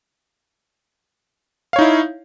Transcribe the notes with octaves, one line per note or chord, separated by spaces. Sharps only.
D#4 E4 C#5 F5